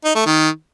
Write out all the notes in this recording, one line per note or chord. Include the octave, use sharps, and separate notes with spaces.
D#4
A3
D#3